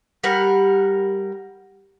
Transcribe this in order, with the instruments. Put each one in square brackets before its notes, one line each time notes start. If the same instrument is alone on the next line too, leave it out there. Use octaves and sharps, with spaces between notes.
[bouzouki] G3 A#4 F#5